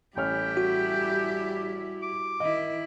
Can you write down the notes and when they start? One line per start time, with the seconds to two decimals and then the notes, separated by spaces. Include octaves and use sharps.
0.17 A1 G3 E4 G4 C#5 G5 F6
0.57 F#4
2.03 D6
2.40 D#3 E4 D#5